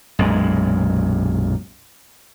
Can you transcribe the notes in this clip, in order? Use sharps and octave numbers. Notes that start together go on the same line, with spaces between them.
B1 F#2 A#2 G#3